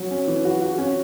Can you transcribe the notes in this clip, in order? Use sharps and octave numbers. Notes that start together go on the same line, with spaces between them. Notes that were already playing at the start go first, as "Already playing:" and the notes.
Already playing: F#3
C#4
E3
F#4
F#4
C#4